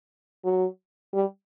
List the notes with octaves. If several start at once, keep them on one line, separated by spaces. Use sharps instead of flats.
F#3
G3